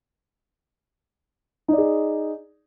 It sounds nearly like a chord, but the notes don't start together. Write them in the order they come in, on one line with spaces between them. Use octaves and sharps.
D#4 D5 G#4